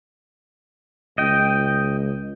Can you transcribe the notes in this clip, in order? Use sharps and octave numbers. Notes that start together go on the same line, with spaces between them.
C#2 D#5 G5